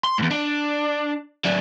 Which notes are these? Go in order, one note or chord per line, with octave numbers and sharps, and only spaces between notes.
C6
E2 G#2
D4
F#3 D4